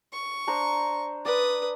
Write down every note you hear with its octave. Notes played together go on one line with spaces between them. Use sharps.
C#6
D4 C5 A#5
B4 D5 D#6